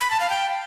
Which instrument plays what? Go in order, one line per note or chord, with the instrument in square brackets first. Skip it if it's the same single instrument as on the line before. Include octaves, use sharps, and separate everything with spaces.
[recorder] B5
A5
F5
G5